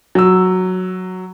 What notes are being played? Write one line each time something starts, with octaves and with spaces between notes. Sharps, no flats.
F#3 E6